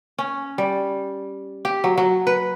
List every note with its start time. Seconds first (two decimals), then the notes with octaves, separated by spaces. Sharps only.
0.18 C#4
0.58 G3
1.65 G4
1.84 F#3
1.98 F#3
2.27 B4